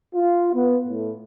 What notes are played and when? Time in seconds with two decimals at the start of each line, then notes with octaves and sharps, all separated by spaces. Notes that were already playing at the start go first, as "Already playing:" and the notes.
0.14 F4
0.54 B3
0.87 A2